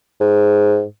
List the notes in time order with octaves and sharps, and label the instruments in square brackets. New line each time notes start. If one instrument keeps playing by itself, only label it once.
[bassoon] G#2